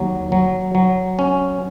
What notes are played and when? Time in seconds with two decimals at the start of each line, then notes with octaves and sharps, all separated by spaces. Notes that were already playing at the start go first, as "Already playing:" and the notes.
Already playing: D#2 F#3
0.32 F#3
0.75 F#3
1.19 C#4